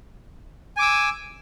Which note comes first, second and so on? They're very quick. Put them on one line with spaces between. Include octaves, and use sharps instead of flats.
G#5 D6 E6